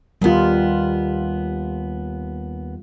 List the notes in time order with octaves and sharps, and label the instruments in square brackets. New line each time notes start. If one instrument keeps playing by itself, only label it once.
[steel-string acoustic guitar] D#2 B3 [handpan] G3 F4